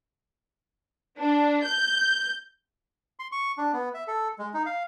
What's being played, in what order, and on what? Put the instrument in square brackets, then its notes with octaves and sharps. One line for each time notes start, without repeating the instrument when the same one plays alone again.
[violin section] D4
G6
[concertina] C6
C#6
D4
B3
E5
A4
G#3
D#4
F5